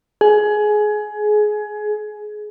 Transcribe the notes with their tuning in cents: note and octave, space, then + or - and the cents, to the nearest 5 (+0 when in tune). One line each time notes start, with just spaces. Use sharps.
G#4 +20